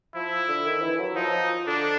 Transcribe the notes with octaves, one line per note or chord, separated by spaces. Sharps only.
F3 E4
D3
D#3
E3
F#3
F3 D#4
D3 D4